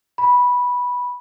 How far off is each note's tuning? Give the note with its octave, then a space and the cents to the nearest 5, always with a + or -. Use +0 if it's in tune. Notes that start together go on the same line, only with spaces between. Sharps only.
B5 -10